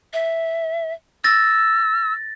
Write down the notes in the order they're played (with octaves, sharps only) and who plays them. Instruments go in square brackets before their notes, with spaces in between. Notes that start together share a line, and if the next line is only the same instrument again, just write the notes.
[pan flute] E5
[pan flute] E6 [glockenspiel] A6 A#6